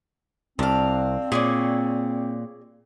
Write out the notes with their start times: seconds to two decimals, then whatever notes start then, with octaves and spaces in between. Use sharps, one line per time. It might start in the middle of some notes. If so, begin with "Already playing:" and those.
0.59 C2 C4 D4 F5
1.32 A#2 G#4 C#5 D5